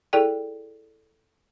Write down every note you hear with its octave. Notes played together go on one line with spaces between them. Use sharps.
E4 G#4 A4 D5 G5